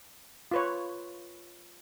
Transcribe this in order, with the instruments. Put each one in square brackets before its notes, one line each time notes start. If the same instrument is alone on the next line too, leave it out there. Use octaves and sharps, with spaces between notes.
[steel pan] F4 B4 C#5